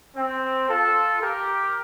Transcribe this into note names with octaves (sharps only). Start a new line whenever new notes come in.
C4
F4 A4
G4 A#4